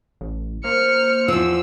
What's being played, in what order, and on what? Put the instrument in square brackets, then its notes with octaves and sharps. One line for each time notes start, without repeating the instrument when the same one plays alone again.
[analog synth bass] A1
[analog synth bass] A#3 [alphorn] C5 [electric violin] F6 C#7
[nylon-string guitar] E2 F3 [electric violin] E6